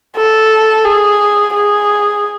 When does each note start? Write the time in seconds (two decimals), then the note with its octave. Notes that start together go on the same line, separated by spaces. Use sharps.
0.17 A4
0.85 G#4
1.55 G#4